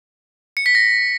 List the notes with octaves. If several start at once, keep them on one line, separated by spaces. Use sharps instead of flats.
C#7
B6
A#6